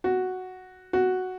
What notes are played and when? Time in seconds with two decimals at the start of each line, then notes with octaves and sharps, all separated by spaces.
0.04 F#4
0.93 F#4